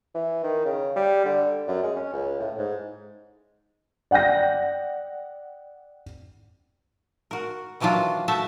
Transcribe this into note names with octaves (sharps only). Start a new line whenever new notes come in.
E3
D#3
C#3
G3
D3
F#2
G#3
C#4
C#2
A2
G#2
D5 F#5 G5 G6 A#6
F#4 A#4
D#3 E3 F#3 D4 F4 F#4
A3 F#4 E5 A5